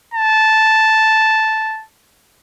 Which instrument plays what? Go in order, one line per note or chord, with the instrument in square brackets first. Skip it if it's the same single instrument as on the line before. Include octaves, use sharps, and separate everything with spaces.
[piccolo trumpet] A5